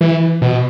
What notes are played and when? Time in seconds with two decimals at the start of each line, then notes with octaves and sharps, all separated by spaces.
0.01 E3
0.42 B2